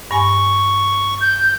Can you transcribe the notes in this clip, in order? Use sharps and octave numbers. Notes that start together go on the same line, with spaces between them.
G2 G#5 C#6
G6